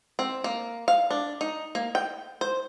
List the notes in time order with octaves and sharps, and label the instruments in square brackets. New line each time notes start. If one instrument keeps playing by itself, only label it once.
[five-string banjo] C4
A#3
F5
D4
D#4
A#3
G5
C5